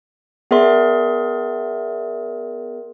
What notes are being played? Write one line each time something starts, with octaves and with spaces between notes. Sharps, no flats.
B3 G#4 A#4 D5 E5 C6